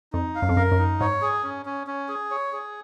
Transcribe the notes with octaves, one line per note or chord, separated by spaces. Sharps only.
F2 D#4
F5
F#2
F2
F#2 A#4
F#2
D#4
G#2 C#5
G#4
C#4
C#4
C#4
G#4
C#5
G#4